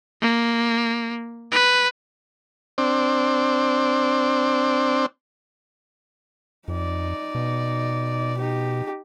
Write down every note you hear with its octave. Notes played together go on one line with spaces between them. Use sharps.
A#3
B4
C4 D4
F2 D#4 D5
B2
D#4 G4